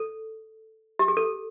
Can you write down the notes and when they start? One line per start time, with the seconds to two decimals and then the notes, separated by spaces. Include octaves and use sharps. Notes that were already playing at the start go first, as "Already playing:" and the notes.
Already playing: A4
0.99 G4
1.08 G#4
1.17 A4